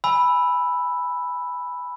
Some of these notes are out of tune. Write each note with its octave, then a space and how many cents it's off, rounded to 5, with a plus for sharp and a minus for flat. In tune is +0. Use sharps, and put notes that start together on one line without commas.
G#5 +0 B5 +0 E6 +0